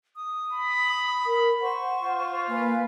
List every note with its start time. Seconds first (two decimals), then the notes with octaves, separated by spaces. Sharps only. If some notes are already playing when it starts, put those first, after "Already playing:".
0.15 D#6
0.53 B5
1.26 A#4
1.62 C5 F#5 C6 C#6
2.03 F4
2.48 A#3 B4 F5 G#5